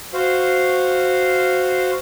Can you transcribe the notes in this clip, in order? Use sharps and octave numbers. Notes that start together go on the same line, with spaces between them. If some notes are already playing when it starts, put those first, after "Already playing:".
F#4 C5 F5